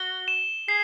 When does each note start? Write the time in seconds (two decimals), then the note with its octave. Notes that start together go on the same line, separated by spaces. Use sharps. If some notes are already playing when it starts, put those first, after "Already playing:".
Already playing: F#4 G7
0.28 E7
0.68 G#4 C7